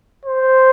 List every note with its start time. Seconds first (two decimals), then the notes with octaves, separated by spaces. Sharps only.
0.25 C5